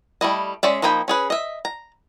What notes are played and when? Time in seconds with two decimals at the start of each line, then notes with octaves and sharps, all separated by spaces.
0.21 G3 A3 E4 D#5
0.63 G#3 C#4 D5 E5
0.82 F3 A#3 D#4 G5 B5
1.08 C#4 G#4 B4
1.30 D#5 E5
1.65 A#5